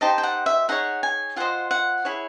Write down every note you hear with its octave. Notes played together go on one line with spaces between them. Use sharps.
D#4 G4 C5 D#5 A5
G5
F#5
E5
D#4 G#4 C#5 F#5
G#5
F4 G#4 C5 D#5 F#5
F#5
E4 G#4 C#5